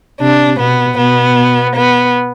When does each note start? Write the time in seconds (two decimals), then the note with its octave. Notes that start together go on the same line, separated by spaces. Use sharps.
0.21 C3 D4
0.59 B2 B3
0.98 B2 B3
1.75 B3